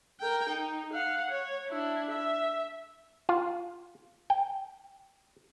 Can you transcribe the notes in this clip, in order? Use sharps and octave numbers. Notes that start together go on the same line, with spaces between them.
A#4 G5
D#4
F5 F#5
C#5
D4 E4
E5
F4
G5